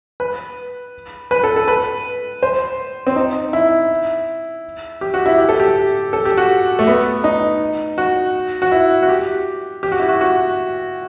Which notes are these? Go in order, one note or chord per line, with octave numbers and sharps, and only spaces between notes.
B4
B4
A4
A4
B4
C5
C4
D#4
E4
G4
F#4
E4
G4
A4
G4
A4
G4
F#4
A3
B3
D#4
F#4
F#4
E4
F#4
G4
G4
F#4
E4
F#4
F#4